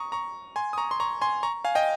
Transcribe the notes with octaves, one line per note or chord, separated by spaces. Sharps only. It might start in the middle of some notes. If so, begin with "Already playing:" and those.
Already playing: A#5 C#6 D#6
A#5 C#6
G#5 C6
D#6
A#5 C#6
C6
A#5 C#6
G#5 C6
A#5 C#6
F5 G#5
D#5 G5